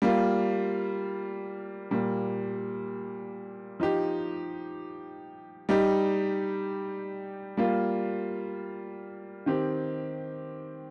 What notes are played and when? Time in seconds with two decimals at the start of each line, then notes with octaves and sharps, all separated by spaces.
0.02 G3 A#3 F4
1.91 A#2 G3 A#3
3.80 F3 D#4 G4
5.69 G3 D#4 G4
7.57 G3 A#3 F4
9.46 D#3 C4 G4